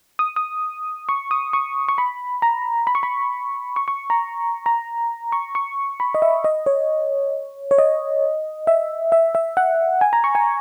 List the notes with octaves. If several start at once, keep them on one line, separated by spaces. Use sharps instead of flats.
D#6
D#6
C#6
D#6
C#6
C#6
B5
A#5
B5
C#6
B5
C#6
C#6
A#5
A#5
C#6
C#6
B5
D#5
E5
D#5
C#5
C#5
D#5
E5
E5
E5
F#5
G#5
A#5
C#6
G#5